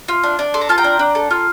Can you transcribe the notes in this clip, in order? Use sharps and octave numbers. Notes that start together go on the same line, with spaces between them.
F4
D4
D4
A4 C6
A#5
F4 A5
G5 A#5
D4
D4
A4
F4